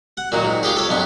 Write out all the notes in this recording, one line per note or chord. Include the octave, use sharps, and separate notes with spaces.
F#5
A#2 D#3 F#3
G#2
F4 G4 G#4
A4 C#5
B1 G2 B3